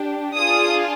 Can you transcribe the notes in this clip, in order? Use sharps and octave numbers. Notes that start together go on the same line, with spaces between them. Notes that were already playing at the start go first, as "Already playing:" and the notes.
Already playing: D4 G4
D4 F4 G#4 D#6